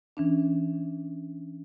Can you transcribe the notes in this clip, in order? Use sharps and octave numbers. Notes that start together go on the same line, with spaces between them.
E3 C#4 D4